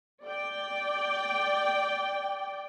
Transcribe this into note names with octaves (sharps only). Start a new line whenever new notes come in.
D5 G5